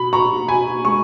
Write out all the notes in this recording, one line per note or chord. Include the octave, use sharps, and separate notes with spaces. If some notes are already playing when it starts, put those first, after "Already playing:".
Already playing: B2 B5
B2 A#5 C#6
B2 G#5 B5
G#3 C#6